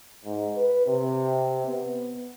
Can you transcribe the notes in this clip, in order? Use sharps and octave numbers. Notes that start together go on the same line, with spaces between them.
G#2
B4
C3
B3